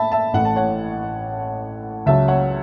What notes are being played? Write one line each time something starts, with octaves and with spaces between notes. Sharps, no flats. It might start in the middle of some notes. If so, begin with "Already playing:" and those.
Already playing: A2 E5 A5 B5
E5 A5
A1 A2 E3 F#5
A5
C#5 F#5
C#2 C#3 F#3 E5 A5
C#5 F#5